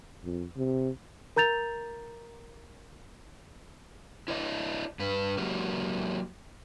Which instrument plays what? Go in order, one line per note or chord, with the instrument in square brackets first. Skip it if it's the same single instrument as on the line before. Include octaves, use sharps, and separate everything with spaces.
[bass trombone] F2
C3
[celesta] A#4 A#5 G6 A6 F7
[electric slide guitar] E4 C5 D5 D#5
G2 B4
F#3 A#3 F#4 G4 A#4